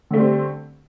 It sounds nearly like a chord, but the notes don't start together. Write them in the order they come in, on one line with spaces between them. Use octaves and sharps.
D3 A3 G3 C4